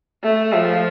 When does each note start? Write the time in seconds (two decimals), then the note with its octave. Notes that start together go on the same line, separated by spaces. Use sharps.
0.24 A3
0.54 F3